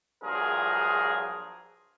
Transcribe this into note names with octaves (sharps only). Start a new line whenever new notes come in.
A#1 G2 F3 F#3 G#4 A#4